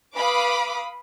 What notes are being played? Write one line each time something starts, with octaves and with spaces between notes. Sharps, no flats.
B4 F5 B5 D6 D#6